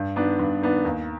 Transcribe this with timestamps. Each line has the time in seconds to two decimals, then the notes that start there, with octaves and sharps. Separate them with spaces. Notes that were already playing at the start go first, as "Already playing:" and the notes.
Already playing: G2
0.16 D#3 B3 D4
0.39 G2
0.62 D#3 B3 D4
0.85 D#2